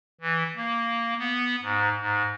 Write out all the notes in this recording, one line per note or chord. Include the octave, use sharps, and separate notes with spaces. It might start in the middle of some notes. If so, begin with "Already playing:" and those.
E3
A#3
B3
G#2
G#2